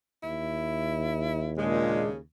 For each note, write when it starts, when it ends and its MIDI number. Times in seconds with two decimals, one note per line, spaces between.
0.23 2.20 39
0.23 1.51 64
1.58 2.05 46
1.58 2.18 49
1.58 2.08 56
1.58 2.08 62